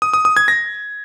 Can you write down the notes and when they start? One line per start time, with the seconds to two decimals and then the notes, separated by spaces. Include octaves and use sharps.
0.02 D#6
0.13 D#6
0.25 D#6
0.37 G#6
0.48 A#6